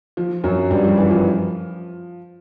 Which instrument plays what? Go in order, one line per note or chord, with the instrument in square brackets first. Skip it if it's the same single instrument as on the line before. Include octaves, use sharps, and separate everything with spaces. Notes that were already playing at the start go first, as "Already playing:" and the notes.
[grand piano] F3
F#2 F#3
G2 G3
F3
E3
F3